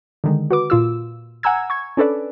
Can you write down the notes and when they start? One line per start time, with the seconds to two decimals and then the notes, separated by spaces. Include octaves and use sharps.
0.24 D3 D#3 G#3
0.51 F#4 B4 D6
0.70 A#2 F4 E6
1.43 F#5 G#5 A#5 E6 G#6
1.70 C#6 G#6
1.97 C#4 D4 A4 B4 D5